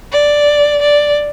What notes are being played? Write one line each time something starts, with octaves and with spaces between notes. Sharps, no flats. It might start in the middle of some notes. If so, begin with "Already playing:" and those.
D5
D5